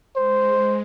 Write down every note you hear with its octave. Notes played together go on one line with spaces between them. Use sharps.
G#3 C5